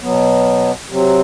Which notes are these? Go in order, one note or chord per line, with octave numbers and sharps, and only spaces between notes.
B2 F#3 B3
C3 F#3 C4